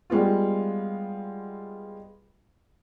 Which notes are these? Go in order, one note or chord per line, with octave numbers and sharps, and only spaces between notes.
G3 G#3 B3 F4